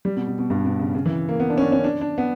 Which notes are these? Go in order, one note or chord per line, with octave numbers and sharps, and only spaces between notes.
G3
B2
B2
B2
G2
B2
C#3
C#3
E3
A#3
B3
D4
C#4
D4
C#4
D4
D4
B3